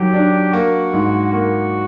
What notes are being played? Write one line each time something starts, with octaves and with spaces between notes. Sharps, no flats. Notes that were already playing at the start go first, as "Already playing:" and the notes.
Already playing: D#3 F#3 G4
D4
A#3 F#4
G#2
A#3 F#4